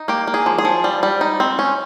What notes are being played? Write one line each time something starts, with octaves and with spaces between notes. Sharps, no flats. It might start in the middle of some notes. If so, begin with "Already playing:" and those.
Already playing: D#4
A#3 G4
A#3
G#4
F3
G#4
F3
G3
G3
D#4
C4
C#4